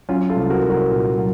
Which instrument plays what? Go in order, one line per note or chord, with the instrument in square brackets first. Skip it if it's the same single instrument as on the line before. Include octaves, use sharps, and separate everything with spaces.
[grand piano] F#3 C#4 F4
F4 A4
C2
F#4 A#4
C2
F#4 A#4
A#2
F#3